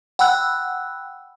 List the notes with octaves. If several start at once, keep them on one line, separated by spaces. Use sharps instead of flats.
F#5 G5 B5 E6 F#6